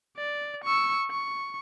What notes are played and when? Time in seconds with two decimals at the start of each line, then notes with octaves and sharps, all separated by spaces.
0.17 D5
0.64 C#6 E6
1.11 C#6